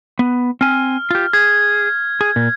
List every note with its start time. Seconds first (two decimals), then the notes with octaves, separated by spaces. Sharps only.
0.19 B3
0.61 C4 G#5 F6
1.11 F4 G4
1.33 G#4 G#6
2.21 G#4
2.36 A#2